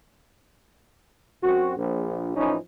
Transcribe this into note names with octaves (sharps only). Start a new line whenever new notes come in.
F#2 C4 F#4
A#1
A2 E3 F3 C#4 D#4